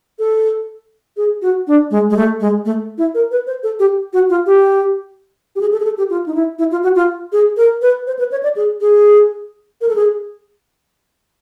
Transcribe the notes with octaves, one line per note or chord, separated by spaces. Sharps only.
A4
G#4
F#4
D4
G#3
G#3
A3
G#3
A3
E4
A#4
B4
C5
A4
G4
F#4
F4
G4
G4
G#4
A4
G#4
A4
G4
F4
D#4
E4
E4
F4
F#4
F4
G#4
A#4
B4
C5
B4
C#5
D5
G#4
G#4
A#4
A4
G#4